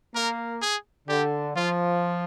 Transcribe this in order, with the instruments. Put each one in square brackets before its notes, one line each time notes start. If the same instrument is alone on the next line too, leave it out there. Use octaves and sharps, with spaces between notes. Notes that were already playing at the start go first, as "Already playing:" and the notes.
[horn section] A#3 [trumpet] A#4
[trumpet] G#4
[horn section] D3 [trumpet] G4
[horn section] F3 [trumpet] F4